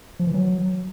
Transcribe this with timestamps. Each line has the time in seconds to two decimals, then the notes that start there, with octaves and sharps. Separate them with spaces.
0.19 F3
0.27 E3
0.34 F#3